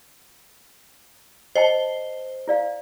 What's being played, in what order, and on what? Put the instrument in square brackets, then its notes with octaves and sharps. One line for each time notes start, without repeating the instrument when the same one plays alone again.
[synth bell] C5 [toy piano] D#5 G5 A5
[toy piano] E4 D5 F5